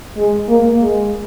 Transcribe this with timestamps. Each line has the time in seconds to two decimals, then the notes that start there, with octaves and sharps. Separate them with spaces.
0.17 G#3
0.49 A#3
0.82 G#3